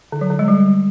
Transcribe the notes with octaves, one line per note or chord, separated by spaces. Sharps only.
D3
F#3
D3
G#3
G3